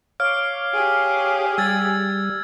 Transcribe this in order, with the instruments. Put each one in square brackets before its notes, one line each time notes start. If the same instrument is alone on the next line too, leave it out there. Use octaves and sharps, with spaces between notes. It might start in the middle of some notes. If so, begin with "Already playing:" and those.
[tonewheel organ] C#5 F5 D6 [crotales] F6
[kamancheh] G4 G#4
[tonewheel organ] G3 [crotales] E6 G#6 A6